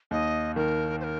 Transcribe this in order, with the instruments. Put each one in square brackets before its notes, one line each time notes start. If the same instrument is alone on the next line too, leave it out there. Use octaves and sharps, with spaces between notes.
[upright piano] D#2 [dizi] D#5
[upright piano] D#3 [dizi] A#4
[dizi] C5
A#4